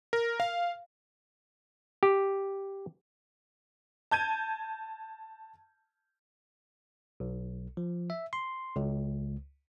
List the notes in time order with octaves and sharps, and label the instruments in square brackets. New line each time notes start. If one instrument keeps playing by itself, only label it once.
[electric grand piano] A#4
F5
[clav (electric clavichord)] G4
[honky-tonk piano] A5 G6 G#6 D#7
[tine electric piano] B1
F3
E5
C6
C#2